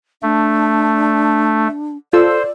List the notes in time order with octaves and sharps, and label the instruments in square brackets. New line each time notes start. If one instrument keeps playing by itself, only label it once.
[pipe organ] A3 [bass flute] D4
[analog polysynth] F4 A4 E6 [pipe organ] C5 [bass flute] D5